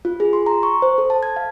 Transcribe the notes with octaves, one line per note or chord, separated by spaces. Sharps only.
F4
G#4
C6
A#5
C#6
C5
A4
A5
G#6
F5